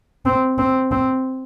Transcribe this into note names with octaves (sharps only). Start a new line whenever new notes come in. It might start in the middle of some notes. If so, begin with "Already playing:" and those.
C4
C4
C4